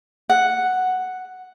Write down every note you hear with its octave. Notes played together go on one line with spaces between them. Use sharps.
F#5